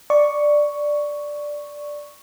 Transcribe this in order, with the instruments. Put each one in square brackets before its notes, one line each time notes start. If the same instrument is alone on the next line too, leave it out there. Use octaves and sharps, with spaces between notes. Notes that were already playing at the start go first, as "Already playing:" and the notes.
[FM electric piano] D5 C#6